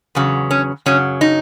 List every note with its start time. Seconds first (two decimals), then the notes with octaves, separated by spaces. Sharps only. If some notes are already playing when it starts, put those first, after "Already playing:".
0.15 E2 C#3 F#3
0.51 C#4
0.86 F#2 C#3 F#3 C#4
1.21 D#4